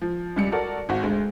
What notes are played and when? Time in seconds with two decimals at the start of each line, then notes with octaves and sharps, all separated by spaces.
0.02 F3
0.36 C#2 G3 C#7
0.52 F#4 A4 A#4 D5
0.89 G#1 F#4
1.03 D2 G#3